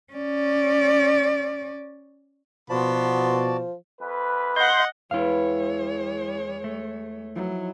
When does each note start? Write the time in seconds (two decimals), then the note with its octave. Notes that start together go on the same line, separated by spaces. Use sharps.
0.13 C#4 D5
2.70 B2 F3 B3 F#4 D5 A5 C6
4.00 F2 B4
4.56 D#5 F#5 C6 G6
5.11 E2 G#3 E4 C#5 F5 G5 B5
6.64 A3
7.36 F3 F#3 D#4 E4